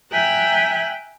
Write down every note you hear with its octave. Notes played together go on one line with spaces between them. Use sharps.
E5 G5 G#5 A#5 F#6